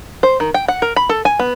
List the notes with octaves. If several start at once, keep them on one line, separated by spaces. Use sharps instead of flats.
C5
D#3
G5
F#5
A#4
B5
A4
G#5
B3